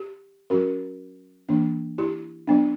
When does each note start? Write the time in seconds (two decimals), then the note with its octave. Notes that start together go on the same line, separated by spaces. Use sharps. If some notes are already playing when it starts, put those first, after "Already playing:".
Already playing: G4
0.50 F#3 C#4 F#4 A#4
1.49 E3 A#3 D4
1.98 E4 G4
2.47 F#3 B3 D4